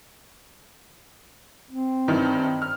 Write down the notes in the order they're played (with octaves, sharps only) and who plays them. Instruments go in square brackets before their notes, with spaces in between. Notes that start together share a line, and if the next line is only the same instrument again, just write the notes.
[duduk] C4
[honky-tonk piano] G2 D#3 E3
F6